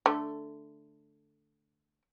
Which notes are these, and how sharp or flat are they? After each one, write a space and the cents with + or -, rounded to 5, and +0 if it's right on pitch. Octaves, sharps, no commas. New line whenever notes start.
D3 +0 A3 +0